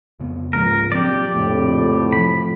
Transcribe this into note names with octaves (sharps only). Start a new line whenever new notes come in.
F2 C#3 B3
C#2 G#2 F3 A#3 A#4
A#1 F3 F#3 C4 G4 D5
A#1 F2 A2 C#3 F3 A#3
C3 E3 F3 A3 B5